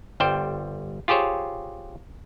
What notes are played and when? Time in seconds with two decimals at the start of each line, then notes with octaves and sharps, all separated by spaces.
0.20 G1 G3 C5 G5
1.08 F4 G4 G#4 C5 C#5